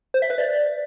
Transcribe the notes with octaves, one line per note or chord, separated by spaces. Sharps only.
C5
E5
B4
D5